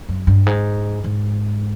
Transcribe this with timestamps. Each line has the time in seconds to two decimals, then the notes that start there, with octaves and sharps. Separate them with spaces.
0.09 F#2
0.27 G2
0.46 G#2
1.04 G#2